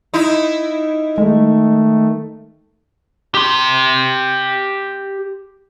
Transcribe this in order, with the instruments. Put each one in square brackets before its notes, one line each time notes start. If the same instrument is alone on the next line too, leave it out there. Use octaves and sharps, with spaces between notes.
[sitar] D#4 E4
[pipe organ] D#3 A3 [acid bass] G#3
[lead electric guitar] G4 C6